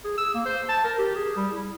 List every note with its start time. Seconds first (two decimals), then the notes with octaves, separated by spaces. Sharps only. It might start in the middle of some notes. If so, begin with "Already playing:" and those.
0.04 G#4
0.18 E6
0.34 A#3
0.46 C5
0.69 A5
0.84 A#4
0.98 G4
1.15 G#4
1.36 G3
1.52 E4